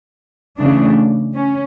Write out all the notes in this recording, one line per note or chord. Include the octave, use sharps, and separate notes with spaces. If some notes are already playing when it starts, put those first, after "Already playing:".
C#3 E3 A3 D4
C#4